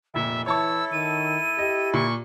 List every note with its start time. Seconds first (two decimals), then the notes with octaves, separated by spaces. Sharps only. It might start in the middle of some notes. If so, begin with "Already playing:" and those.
0.14 F1 A#2 E5
0.46 E3 E4 A4 C#5 A5 C#6 E6
0.92 D#3 D#7
1.59 G4 D#5
1.94 A#2 C#6